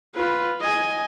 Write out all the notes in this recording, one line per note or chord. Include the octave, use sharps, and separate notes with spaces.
F4 B4
D#5 G#5